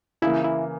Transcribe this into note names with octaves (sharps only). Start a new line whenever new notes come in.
C#3 E3 A#3 E4
E4